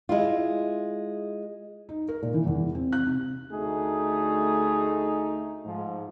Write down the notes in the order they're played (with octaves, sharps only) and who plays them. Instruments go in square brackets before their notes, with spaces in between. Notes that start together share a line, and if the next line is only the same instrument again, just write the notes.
[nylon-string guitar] G#3 E4 F4
[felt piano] D#4
A#4
A#2
E3
E2
C4
F#6
C3
[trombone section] D2 A3 D#4 G#4
G#2 F3